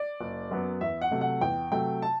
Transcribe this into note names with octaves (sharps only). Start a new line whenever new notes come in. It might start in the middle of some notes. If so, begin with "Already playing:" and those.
Already playing: D5
F#1
F#2 F#3 B3
E2 E5
F#5
C3 F#3 A3
F#5
E2 G5
C3 F#3 A3 G5
A5